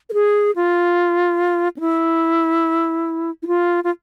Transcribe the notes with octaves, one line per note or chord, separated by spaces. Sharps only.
A#4
G#4
F4
C#4
E4
E4
F4
F4